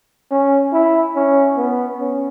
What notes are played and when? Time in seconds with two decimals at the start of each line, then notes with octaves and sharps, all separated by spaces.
0.31 C#4
0.73 E4
1.16 C#4
1.57 B3
2.00 C#4